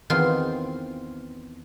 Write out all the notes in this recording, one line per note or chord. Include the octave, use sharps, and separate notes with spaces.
E2 D#3 C4 F4 C6